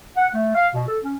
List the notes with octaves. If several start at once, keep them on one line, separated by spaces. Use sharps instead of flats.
F#5
A3
F5
B2
A4
C#4